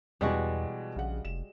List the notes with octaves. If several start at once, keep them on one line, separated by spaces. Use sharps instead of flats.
E2 B2 E3 G3 G#3 F#4
A#1 C#3 F#5
F1 E7